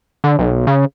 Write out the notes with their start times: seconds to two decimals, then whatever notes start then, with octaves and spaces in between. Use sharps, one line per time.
0.24 D3
0.39 B1
0.67 C#3